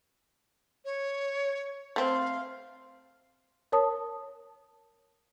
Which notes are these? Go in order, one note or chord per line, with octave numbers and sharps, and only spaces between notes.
C#5
A3 C4 F5
A#4 C#5 A5 D#6